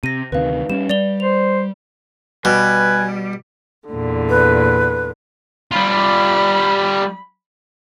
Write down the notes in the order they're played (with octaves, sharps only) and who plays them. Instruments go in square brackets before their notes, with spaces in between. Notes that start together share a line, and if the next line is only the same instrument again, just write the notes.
[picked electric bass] C3 [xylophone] A#6 D#7
[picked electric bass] D2 C3 D#3 [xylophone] B4 F5
[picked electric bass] G3 C4 C#4 [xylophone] E7
[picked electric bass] G3 [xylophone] D5 F7 G7
[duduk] C5 [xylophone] F7
[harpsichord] B2 [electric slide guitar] G3 [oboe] B4 [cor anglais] G#5
[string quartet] E2 A#2 D3
[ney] B4
[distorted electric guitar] G3 F4 [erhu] B5